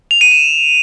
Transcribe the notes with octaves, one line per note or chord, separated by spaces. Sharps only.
F7
D#7
E7